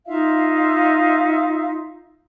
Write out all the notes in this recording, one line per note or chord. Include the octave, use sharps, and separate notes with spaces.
D#4 F4 E5 F5